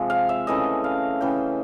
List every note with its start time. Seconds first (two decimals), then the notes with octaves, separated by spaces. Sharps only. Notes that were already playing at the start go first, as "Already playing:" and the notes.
Already playing: C3 F3 G#3
0.10 F5
0.29 E5
0.47 C#3 E3 A3 D#5
0.84 F5
1.21 C#3 E3 A3 G5